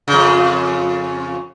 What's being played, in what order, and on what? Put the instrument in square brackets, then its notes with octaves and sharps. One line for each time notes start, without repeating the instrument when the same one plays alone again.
[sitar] F2 C#3